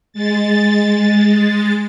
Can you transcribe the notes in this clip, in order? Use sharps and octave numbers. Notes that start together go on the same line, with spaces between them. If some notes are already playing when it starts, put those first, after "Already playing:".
G#3 A6